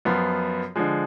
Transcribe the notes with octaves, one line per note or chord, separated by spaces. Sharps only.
F#2 F3 B3 F4
D3 F3 G#3